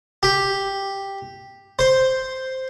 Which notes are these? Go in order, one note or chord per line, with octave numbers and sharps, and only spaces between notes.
G4
C5